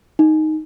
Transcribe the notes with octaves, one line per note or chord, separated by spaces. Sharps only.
D#4